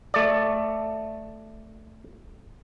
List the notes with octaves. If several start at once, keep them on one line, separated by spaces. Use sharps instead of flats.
A3 D5